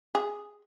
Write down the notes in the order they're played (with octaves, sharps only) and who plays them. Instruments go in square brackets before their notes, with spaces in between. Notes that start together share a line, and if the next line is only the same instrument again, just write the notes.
[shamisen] G#4